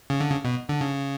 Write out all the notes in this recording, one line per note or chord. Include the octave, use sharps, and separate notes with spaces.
C#3
D3
C#3
B2
D3
C#3